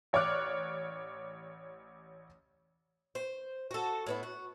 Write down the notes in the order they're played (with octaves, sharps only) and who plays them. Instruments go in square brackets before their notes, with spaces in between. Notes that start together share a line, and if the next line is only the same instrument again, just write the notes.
[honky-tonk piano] A1 C#5 D5 D6 F6 F#6
[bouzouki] C5
F#4 A4
A2 B3 E4
F#4